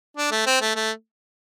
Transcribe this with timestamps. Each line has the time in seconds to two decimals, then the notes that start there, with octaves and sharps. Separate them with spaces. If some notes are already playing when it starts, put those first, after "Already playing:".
0.17 D4
0.31 A3
0.46 C4
0.61 A3
0.76 A3